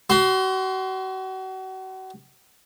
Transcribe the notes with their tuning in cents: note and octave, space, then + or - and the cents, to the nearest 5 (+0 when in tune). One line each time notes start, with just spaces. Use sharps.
F#4 +35 C6 +0